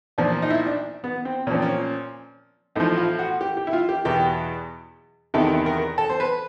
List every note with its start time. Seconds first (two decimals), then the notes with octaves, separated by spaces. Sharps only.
0.18 A#2 F3 D4
0.42 D#4
0.50 E4
0.67 D4
1.04 B3
1.25 C4
1.47 A#2 C#4
1.51 F3 C4
1.62 C#4
2.76 A2 F3 D#4
2.97 F4
3.19 F#4
3.41 G4
3.57 G4
3.67 E4
3.73 F4
3.89 G4
4.05 E2 B2 G4
5.34 E2 C3 D#3 A4
5.66 A#4
5.98 A4
6.10 C5
6.20 B4